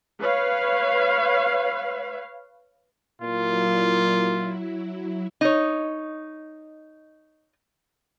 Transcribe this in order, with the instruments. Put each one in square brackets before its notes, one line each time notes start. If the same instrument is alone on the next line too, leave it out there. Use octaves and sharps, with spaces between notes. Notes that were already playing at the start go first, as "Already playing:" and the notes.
[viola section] B4 C#5 F5
[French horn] A#2 [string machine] F#3 E4 [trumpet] F4
[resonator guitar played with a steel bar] D#4 C#5